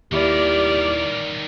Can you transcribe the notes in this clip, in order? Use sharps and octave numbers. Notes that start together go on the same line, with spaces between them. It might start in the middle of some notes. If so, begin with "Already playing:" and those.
D#2 D#3 G3 E4 G4 D5 F6